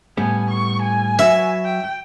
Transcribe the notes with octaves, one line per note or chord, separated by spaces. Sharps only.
A2 G3 B3 G#5
C#6
G#5
F#3 F#4 B4 E5
G5